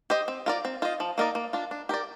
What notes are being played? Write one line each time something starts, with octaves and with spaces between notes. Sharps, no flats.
G4 C5 D#5
C4
F4 A#4 D5
C4
F4 C5 D#5
F3
A#3 D#4 A#4 D5
A#3
D4 F4
D4
G4 A#4 D5